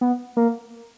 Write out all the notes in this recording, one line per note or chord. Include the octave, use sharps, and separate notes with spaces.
B3
A#3